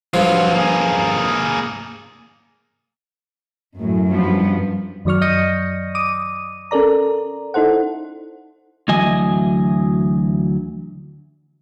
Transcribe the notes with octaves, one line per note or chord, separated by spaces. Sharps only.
G2 F3 F#3 F4
A#3 G#4
F#2 A2
G2 F3 B3
F#2 D#3 F#3 D5 C#6 F6
D#5 D#6 G6 A#6 C#7 D#7
D6 D#6 D#7
C#4 A4 A#4 D5 A#5
D#4 E4 A4 C5 F#5
D2 E3 F#3 D#5 G#5